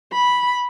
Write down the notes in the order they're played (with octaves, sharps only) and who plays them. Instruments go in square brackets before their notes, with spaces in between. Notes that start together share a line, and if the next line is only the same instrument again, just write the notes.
[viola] B5